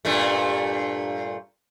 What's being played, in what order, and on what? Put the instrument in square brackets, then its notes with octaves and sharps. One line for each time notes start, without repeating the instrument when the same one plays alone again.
[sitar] G2 A#2 A3